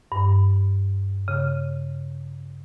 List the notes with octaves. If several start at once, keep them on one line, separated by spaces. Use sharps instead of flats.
G2
C#3